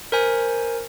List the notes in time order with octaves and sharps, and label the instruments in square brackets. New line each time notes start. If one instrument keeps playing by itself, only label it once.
[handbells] A#4 C5 G#5